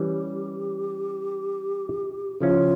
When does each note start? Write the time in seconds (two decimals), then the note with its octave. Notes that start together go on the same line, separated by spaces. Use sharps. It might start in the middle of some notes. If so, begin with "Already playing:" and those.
Already playing: E3 G3 C#4 G4
2.40 C#3 F3 C#4 E4 F4